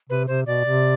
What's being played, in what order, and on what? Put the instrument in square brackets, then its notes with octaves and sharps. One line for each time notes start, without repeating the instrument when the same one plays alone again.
[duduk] C3 [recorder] B4
[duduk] C3 [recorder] C5
[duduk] B2 [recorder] D5
[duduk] C3